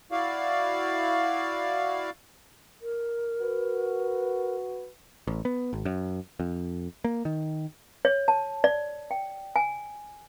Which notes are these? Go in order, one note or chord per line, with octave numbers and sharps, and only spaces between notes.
E4 F#4 D5 F5
A#4
F#4 B4
A1
B3
G#1
F#2
F2
A#3
D#3
C#5
A5
D5
G5
G#5